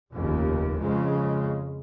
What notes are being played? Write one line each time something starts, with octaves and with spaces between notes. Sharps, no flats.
F1 D#2 C#3
F2 C#3 F3 G#3